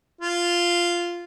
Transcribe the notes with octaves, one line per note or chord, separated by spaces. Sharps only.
F4